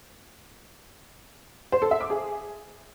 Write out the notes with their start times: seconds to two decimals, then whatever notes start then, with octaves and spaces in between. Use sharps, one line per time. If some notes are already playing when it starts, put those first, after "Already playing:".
1.72 C5
1.82 A4
1.91 E5
2.01 D6
2.10 G#4